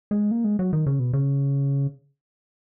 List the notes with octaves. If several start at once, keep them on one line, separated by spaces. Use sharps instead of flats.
G#3
A#3
G#3
F#3
D#3
C#3
B2
C#3